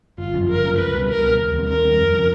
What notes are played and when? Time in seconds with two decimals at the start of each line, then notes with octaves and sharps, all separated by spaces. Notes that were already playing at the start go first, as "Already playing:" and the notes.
0.18 G1 F4
0.34 F#2 C#3 F3
0.49 G1 A#4
0.64 F#2 C#3 F3
0.78 C#2 B4
0.94 B2 G3
1.08 C#2 A#4
1.23 B2 G3
1.39 D#2
1.53 D#3 G3 C4
1.68 D#2 A#4
1.84 D#3 G3 C4
1.98 F2
2.13 C#3 F3